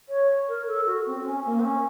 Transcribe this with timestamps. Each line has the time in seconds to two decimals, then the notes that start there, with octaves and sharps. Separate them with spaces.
0.09 C#5
0.48 A#4
0.67 A4
0.86 F#4
1.06 C4
1.19 C4
1.26 C#4
1.45 A#3
1.59 C4
1.65 C#4